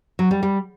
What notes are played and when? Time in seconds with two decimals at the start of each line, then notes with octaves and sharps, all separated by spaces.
0.19 F#3
0.31 G3
0.43 G3